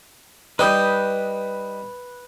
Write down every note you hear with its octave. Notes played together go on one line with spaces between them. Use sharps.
G3 D#4 B4 D#6 G6